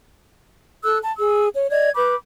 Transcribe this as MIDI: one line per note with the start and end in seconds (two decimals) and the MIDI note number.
0.84 0.98 69
0.84 0.98 88
0.84 0.98 90
1.03 1.12 81
1.17 1.47 68
1.17 1.47 88
1.55 1.67 73
1.69 1.90 74
1.69 1.90 75
1.69 1.90 92
1.95 2.15 71
1.95 2.15 83
1.95 2.15 86
1.95 2.15 91